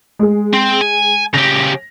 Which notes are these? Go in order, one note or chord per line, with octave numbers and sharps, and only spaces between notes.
G#3 G#4
C4
G#5
C#3 G4 A#6 F7